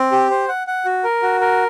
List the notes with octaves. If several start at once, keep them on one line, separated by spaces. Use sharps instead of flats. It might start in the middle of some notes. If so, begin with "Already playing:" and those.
Already playing: C4
G4
C5
F#5
F#5
F#4
A#4
F#4
A#4